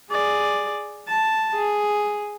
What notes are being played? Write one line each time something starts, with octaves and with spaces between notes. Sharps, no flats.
G#4 D5
A5
G#4